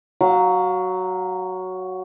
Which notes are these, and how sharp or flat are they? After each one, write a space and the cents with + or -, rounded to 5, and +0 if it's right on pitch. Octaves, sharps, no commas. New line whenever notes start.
F#3 +5 F5 +35